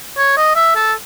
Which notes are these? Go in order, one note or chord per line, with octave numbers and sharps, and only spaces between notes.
C#5
D#5
E5
A4